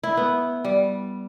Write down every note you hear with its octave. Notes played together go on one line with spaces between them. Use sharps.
E4
B3
G3